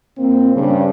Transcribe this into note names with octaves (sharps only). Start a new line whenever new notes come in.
A#2 A#3 C4
G2 C#3